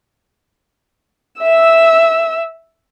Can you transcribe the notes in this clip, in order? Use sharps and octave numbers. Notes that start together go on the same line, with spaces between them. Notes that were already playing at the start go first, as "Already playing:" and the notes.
E5 E6